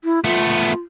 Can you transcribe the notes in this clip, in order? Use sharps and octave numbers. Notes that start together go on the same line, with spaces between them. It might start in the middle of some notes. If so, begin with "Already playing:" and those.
E4
A3 B3 F4